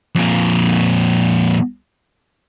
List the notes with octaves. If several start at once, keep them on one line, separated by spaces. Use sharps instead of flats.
F2 A#2